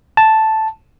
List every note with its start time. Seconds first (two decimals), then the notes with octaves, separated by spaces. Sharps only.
0.17 A5